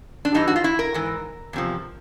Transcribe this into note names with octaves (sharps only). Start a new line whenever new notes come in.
D4
G2 E3 D#4
F#4
F4
E4
A#4
G#2 E3
E2 C3 F3